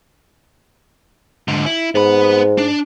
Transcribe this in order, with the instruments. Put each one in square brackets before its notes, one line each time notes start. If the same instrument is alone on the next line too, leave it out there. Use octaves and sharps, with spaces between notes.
[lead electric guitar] G#2 D3
E4
[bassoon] G#2 [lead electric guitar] B3 B5
[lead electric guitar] D4